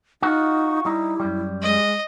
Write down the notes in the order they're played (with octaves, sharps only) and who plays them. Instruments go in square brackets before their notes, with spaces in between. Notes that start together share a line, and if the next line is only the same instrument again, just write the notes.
[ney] D#4 [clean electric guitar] F4 F#4
[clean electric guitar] G3 D#4 [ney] E4
[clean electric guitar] F#2 G3
[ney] G#3 [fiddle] D#5